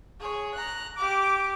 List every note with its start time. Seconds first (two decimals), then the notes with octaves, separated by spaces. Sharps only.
0.20 G#4 C#5
0.54 A#5 F#6
0.97 G4 D6